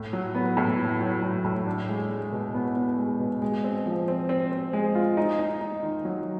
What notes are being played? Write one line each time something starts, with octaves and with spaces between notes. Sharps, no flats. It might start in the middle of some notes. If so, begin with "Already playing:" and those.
Already playing: A2
F#3
B3
A2
F#3
F#3
A2
A2
D4
G#3
G#3
B2
B3
B3
G#3
B2
G#3
C4
F3
C4
C4
C4
G#3
F4
D#4
D#4
D#4
D#3
F#3